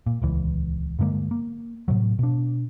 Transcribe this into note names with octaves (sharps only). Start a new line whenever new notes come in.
A#2
D#1 C#2 E3
G2 D3 G#3 A#3
A#3
A2 C3 F#3
B2 D4